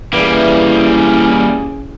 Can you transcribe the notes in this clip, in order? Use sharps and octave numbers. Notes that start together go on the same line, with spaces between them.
E3 G3 A#3 C#4 G#4